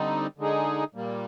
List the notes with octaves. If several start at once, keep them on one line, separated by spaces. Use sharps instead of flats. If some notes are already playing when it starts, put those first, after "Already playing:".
Already playing: D3 G3 C4 D#4
D3 G#3 D#4 G#4
A#2 G3 A#3